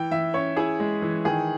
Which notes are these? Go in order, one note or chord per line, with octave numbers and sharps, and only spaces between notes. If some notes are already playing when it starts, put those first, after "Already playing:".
Already playing: E3 G5
E3 E5
C#4 C#5
E4 G#4
G#3
E3
D#3 G#4